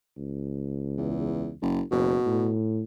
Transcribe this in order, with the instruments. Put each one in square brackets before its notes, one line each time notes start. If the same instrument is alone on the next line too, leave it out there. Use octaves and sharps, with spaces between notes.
[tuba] C#2
[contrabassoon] E2
F#1
[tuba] F#1 [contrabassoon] B2
[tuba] A2